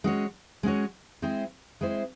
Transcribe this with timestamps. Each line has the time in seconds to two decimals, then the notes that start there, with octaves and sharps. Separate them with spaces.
0.04 G#3 C#4 F#4 C#5
0.63 G#3 C#4 F#4 C#5
1.22 G#3 C4 E4 C5
1.81 G#3 C4 E4 C5